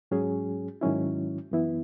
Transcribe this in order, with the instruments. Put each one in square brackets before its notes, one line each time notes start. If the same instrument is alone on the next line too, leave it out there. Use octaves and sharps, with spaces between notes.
[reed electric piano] G#2 F#3 C#4 G#4
G#2 D#3 F#3 C#4 E4
F#2 E3 B3 E4